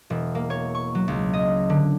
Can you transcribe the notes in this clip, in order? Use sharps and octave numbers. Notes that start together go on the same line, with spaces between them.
E1
A#3
C#5
C#6
F#3
C#2
D#5
D3